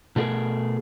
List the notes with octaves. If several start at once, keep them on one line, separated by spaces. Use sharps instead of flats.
B2 A3 F4 G#4 A#4